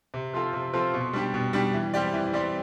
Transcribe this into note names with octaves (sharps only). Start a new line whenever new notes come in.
C3
F3 C4 F4 A4
C3
F3 C4 F4 A4
B2
G3 D4 G4
B2
G3 D4 G4
E3
G3 C4 G4 D5
E3
G3 C4 G4 D5